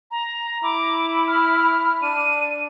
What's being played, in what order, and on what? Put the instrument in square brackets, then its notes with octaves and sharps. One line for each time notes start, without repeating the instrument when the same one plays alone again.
[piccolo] A#5
[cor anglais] E4 [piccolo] D6
[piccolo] F6
[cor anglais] D4 [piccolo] D#7